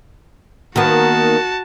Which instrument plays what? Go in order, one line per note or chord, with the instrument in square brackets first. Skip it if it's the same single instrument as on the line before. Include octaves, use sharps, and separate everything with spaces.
[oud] D#3 A#3 B3 [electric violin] F#4 A5